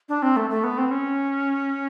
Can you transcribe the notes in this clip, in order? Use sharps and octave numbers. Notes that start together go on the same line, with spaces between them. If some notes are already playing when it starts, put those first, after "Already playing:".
D4
C4
A3
A3
B3
C4
C#4